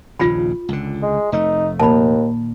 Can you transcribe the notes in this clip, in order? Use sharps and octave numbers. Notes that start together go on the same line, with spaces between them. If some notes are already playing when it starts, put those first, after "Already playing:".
A#1 D#2 C#3 F4 B5
C#2 D3
G#3
F1 A3 D#4
D#2 A#2 D#3 A5 B5